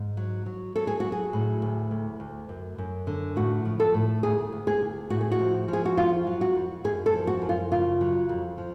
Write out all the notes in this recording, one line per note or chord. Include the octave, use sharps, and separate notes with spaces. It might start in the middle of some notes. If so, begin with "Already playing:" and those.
Already playing: G#2
F#3
F#3
F#3 A4
G#4
F#3 F#4
G#4
A2
D2
D2
D2
F#2
F#2
D3
A2 F#4
F3
A4
A2
D2 G#4
D2
G#4
D2
A2 F#4
G#4
F#4
F3
F3
G#4
F#4
F2 F4
F#3
F#4
F2
F#2 G#4
A4
F3
F#4
F#2
F4
C#3 F4
F#3
F2
F3